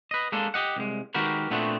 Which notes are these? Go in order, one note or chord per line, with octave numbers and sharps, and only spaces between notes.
B4 D#5
G#3 A#3 D4 A4
G4 D#5 F#5
C2 G#3
D#3 G#3 F#4 G4 A#4 B4
A#2 A3 B3 C4 D4 F#4